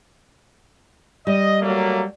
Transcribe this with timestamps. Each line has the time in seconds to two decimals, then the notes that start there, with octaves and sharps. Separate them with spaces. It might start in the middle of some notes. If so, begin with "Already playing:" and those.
1.27 G3 D#5
1.61 F#3 A3 A#3